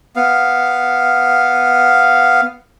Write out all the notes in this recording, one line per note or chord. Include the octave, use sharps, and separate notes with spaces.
B3 F5